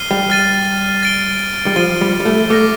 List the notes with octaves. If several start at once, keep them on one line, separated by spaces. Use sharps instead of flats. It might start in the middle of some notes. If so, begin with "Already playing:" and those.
Already playing: F6 C7 D#7 G7
G3
F6 A6 D#7
A6 D7 G7
G3
F3 A6 D#7 G7
G3
G3
A3
A3 D6 F6 A#6